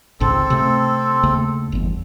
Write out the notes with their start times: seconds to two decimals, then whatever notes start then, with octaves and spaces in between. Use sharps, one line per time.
0.20 G#1 C#2 G#2 C4 A4
0.50 C3 A3
1.23 D#2 C#3 A3
1.72 G1 E2